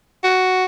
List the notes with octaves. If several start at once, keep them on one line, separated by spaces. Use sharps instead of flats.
F#4